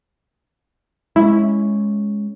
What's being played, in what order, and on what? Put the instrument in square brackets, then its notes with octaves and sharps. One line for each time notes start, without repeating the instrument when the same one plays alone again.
[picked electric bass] G#3 A3 C#4 [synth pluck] E4